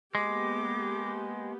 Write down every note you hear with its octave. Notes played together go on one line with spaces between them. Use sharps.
G#3 A#3 B3 G4 D6